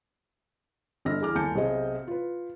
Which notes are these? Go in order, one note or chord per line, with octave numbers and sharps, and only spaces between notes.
G1 D4 D#5 E6 F6 A#6
E2 G#4 D6 F6
G1 D#2 G#5 A5 G6 C#7
B1 C3 G#4 D#5
F4 B4